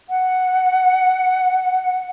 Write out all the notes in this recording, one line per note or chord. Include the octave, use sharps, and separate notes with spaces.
F#5